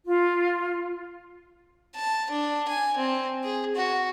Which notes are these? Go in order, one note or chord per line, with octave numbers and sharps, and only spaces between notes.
F4
A5
D4
G#5
C4
G#4
F#4